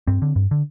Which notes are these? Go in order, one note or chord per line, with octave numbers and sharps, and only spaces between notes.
G2 C4
D3
G2
D3